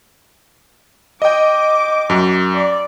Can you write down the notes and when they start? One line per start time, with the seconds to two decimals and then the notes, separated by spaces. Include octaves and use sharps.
1.22 D#5 G5 D6
2.10 F#2
2.54 D5